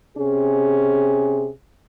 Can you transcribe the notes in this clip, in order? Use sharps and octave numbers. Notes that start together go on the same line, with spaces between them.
C3 C#4 G#4